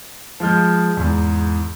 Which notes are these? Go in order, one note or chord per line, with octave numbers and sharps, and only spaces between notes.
F3 G#3 F6 G6
E2 G#2